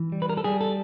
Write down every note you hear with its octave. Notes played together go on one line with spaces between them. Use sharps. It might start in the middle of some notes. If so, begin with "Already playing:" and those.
Already playing: E3
G3
B4
A#4
A4
G3 G#4
A4